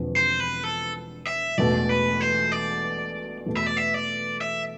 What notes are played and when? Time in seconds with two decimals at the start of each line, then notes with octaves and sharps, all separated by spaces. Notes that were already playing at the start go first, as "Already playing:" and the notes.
Already playing: E1 E2 D3 F3 C4
0.16 C5
0.40 B4
0.64 A4
1.27 E5
1.58 E1 E2 B2 A3 D5
1.89 B4
2.21 C5
2.52 D5
3.46 E2 B2 A3
3.57 E5
3.66 D5
3.77 E5
3.94 D5
4.41 E5